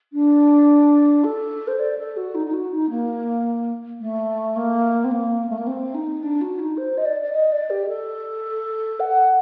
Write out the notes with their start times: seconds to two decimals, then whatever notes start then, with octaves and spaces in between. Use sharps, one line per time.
0.13 D4
1.24 A4
1.67 C5
1.79 D5
1.98 A4
2.16 F#4
2.35 D#4
2.46 D#4
2.53 F#4
2.71 D#4
2.90 A#3
4.00 A3
4.56 A#3
5.04 C4
5.11 A#3
5.49 A3
5.58 A#3
5.67 C4
5.94 D#4
6.23 D4
6.41 F#4
6.59 D#4
6.77 C5
6.97 D#5
7.05 D5
7.21 D5
7.32 D#5
7.52 D5
7.70 G4
7.88 A4
9.00 F#5